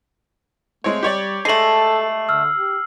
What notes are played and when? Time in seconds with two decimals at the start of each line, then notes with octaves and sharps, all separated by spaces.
0.84 G#3 A3 C4 C#5
1.03 G3 G4 C#5 D5
1.45 G#3 A3 A4 C7 F#7
2.29 D3 E6 F6
2.55 G4